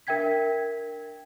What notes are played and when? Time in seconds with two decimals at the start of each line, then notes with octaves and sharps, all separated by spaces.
0.07 D4 A#4 E5 G5 G#6 B6